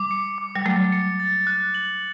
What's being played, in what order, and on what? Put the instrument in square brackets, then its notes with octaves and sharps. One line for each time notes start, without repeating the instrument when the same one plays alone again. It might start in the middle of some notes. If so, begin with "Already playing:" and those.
Already playing: [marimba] G3 [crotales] D6
[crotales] C#7
D6
[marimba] G3
[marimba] F#3 A3 [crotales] A6
[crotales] C#7
A6
F#6
F#7